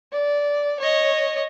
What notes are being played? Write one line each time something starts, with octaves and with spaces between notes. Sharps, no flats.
D5
C#5 D#5